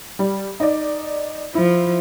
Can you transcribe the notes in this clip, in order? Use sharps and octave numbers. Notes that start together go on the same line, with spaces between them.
G3
D#4 D5
F3 E4